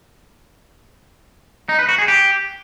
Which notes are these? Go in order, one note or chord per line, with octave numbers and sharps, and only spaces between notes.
D#4
B4
F#4
G#4
G4